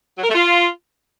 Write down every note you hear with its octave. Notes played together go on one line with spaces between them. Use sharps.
F#3
A#4
A3
F4